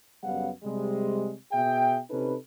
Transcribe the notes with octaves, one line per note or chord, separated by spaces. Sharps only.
F#2 C#3 G3 B3 F5 F#5
C3 G3 G#3
B2 G#4 E5 G5
C3 C#4 D#4 A4 B4